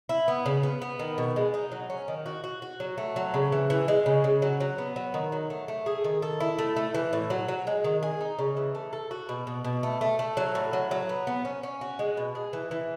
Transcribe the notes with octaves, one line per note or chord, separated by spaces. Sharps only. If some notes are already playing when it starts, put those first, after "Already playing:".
E4
B3
C#3
B3
B3
D#3
B2
G#3
D#4
F#3
C#4
D#3
F#4
F#4
F#4
F#3
A3
F#3
C#3
E3
E3
G#3
C#3
C#3
F#3
F#3
B3
F#3
D#3
F#3
A3
A3
G#4
D#3
A4
E4
A3
A3
E3
A2
F#3
F#3
G#3
D#3
G#4
D#4
C#3
E3
A3
A4
F#4
B2
B2
B2
A3
A3
A3
F#3
A2
F#3
F#3
B3
B3
C#4
C#4
F#4
G#3
B2
G#4
E3
E3